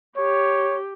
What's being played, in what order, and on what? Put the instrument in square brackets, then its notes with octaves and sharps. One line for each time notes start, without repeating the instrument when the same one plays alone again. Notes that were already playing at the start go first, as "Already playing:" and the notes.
[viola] G4 [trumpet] C#5